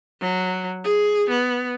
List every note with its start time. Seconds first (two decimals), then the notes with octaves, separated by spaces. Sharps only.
0.21 F#3
0.84 G#4
1.29 B3